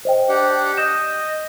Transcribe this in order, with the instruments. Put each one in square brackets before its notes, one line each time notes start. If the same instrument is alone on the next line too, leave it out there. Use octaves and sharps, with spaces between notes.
[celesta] C5 D#5 G5
[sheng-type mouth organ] D4 G4 F#5
[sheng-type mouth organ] D#5 [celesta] D#6 G6 E7